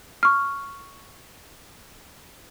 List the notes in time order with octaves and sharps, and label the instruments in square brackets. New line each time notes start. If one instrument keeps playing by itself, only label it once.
[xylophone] C#6 F6